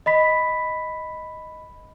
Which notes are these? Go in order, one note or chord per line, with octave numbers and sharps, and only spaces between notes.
D#5 B5 B6